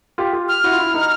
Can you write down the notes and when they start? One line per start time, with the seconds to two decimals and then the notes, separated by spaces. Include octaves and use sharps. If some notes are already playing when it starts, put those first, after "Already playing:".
0.18 F4 G4
0.33 F4 G4
0.48 F6
0.64 E4 F#4
0.72 F4
0.79 E4
0.94 D#4